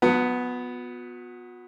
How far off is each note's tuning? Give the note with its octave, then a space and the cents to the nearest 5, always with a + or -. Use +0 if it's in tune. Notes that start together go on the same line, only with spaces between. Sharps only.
F#3 -45 B3 +0 F#5 +0